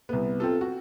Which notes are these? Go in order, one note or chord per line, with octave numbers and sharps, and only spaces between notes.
C2 B3
C4 F4 A4
F#4